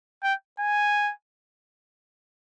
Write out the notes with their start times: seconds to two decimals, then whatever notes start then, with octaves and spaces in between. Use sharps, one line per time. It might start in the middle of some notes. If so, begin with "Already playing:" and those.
0.23 G5
0.59 G#5